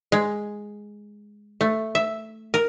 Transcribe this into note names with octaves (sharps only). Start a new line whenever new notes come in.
G#3
A3
E5
A#4